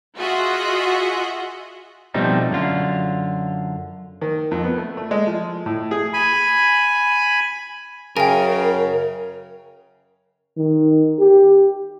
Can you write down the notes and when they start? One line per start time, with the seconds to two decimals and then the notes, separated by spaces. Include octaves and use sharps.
0.18 F4 F#4 G#4 D#5 E5 F#5
2.14 B2 F3 G3 A3 C4 D#4
2.50 F#2 D3 F4
4.22 D#3
4.51 F2
4.63 B3
4.77 A3
4.97 A3
5.11 G#3
5.27 F3
5.66 A2
5.91 G#4
6.14 G#5 B5
8.17 F#2 C#3 A#4 G5 G#5
10.57 D#3
11.19 G4